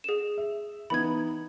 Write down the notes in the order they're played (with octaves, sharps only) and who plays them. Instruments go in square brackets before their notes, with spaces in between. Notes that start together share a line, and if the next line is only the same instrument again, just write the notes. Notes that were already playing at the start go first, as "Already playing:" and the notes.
[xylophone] G#4 E7
[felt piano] E5
[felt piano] E3 B3 D#4 [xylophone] B5 G#6